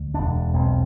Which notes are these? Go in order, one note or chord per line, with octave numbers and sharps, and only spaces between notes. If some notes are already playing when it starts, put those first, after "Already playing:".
Already playing: D2
E1 D4
B1 C4